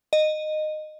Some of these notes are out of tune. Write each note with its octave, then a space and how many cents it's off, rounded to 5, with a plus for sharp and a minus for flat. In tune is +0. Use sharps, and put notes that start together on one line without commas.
D#5 -15